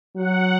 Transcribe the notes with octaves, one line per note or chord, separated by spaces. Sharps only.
F#3 F#5